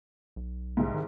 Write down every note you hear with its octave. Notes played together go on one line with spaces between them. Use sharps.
B1
C2 G#2
D#3